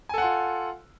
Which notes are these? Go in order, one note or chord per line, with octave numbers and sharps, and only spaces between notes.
F4 A4 F#5 G#5